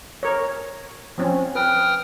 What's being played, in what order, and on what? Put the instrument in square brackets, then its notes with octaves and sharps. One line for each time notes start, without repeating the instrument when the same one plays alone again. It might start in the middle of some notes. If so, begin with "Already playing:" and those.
[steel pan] A#4 C#5
F3 C4 C#4
[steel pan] B4 [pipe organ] G5 D#6 F6